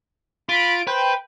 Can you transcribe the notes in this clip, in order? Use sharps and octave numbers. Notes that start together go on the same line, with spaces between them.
F4 B5 D7
B4 C5 G5